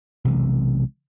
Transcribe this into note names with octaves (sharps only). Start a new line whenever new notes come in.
B1 C3 E3 G#3